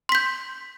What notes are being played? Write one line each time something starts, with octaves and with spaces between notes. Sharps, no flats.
C6 G6 B6